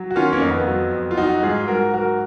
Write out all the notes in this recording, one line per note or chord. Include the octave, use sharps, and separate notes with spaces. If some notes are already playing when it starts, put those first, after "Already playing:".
Already playing: F#3
F#4
D#3 C#4 F4
A#3 C#4
F2
B3
F#3
F2
F4
F#3 D#4 F#4
G#2 F4 G#4
G#2 F#4 A#4
F#3 F#4 A#4